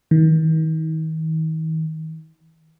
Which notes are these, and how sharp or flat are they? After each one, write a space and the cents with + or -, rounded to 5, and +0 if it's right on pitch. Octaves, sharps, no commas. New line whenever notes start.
D#3 +40